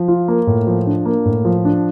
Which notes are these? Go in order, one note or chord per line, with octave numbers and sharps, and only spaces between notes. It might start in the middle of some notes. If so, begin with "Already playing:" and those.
Already playing: F3
F4
A#3
A2
F3
D4
A#3
A2
F3
D4